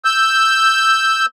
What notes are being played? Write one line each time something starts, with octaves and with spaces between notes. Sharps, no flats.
E6 G6